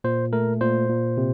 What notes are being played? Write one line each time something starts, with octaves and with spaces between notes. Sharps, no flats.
A#2 C5
A3 A#4
A#2 C5
A#2
C3